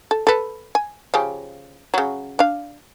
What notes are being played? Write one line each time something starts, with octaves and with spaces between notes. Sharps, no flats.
A4
A4 B4
G#5
C#3 F3 G4
C#3 F#3
D4 F5